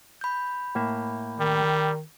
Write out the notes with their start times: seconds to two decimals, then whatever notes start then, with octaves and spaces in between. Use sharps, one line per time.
0.21 B5 G6
0.75 A2 A#3 E5
1.40 D#3 G3